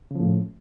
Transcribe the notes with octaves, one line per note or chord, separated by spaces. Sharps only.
A2 C#3 F3